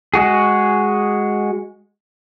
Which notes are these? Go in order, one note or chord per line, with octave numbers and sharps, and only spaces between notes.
G#3 F#4 G#4